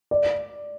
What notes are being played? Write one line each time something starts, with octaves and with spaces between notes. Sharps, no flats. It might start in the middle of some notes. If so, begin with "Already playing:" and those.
D5